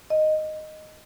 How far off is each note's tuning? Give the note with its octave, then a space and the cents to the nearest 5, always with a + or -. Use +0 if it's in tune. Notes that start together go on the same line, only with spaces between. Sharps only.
D#5 -5